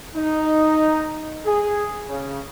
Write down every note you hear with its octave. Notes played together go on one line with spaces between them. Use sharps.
D#4
G#4
C#3